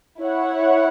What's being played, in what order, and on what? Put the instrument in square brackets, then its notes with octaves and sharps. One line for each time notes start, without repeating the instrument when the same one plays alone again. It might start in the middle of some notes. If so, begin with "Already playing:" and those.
[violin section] E4 C#5 F#5